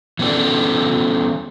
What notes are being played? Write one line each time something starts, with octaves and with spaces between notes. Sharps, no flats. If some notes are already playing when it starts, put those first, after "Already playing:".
E3 B3 C#4 F#4 A4 D5